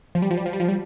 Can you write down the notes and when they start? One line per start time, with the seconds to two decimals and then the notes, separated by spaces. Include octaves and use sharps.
0.15 F3
0.22 G3
0.31 F3
0.38 G3
0.46 F3
0.53 G3
0.60 F3
0.68 G3